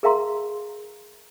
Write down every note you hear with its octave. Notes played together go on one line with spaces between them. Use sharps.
G#4 A#4 E5 F5 A#5 C6